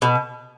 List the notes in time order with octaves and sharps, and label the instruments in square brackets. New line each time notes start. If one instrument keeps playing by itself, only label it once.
[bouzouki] B2